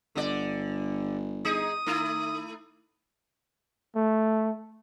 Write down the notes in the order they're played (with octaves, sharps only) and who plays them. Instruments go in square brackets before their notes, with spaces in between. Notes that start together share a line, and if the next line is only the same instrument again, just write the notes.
[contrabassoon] G1 [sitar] D3 D5
[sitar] D#4 G#4 [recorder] D#6
[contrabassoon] D#3 [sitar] A3 E4
[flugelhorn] A3